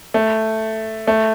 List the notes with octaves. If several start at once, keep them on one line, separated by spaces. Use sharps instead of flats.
A3
A3